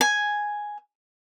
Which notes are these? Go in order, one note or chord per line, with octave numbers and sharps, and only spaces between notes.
G#5